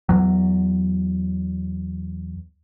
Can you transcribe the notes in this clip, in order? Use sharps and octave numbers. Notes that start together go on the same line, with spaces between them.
E2 F#3